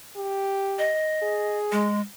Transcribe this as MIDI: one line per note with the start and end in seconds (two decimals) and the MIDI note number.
0.17 0.93 67
0.79 1.58 75
1.22 1.90 68
1.72 2.00 56